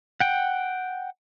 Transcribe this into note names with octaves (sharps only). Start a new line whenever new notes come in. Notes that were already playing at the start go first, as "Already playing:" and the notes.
F#5 G5